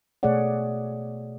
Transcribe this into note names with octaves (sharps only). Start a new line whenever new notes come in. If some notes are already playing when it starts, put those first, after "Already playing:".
B2 A3 G#4 C#5 D5 F#5